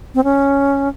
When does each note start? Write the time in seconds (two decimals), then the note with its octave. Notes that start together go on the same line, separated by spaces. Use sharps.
0.15 C4
0.24 C#4